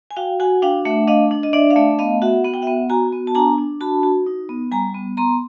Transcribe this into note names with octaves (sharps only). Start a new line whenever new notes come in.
G#5
F#4 F5 G5
F#4 F#5 G#5
D4 F5 G5
A3 E5 F#5
D4 D#5 F5
D4
D#5
D4 D5 E5
F5
A3 D5 E5
B3 D#5 F5
F#4 E5 F#5
B3 F#5
G5
E5 F#5
B3
F#4 G#5 A#5
B3
A5
D4 G#5 A#5
D4
F#4 A5 B5
F#4
D#4
B3
G3 G#5 A#5
B3
B3 A#5 C6